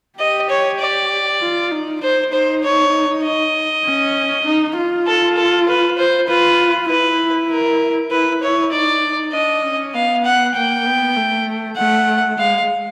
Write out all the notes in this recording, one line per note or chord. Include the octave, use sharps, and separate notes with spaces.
G4 D#5
C#5
D5
F4
D#4
D#4 C5
D#4 C5
C#5
D#5
C#4
D#4
F4
A4
A4
B4
C5
F4 B4
E4 B4
A#4
E4 B4
E4 C#5
D#4 D5
D#4
D4 D#5
C#4
B3 F5
F#5
A#3 G5
B3
A3
A3 F#5
G#3 F5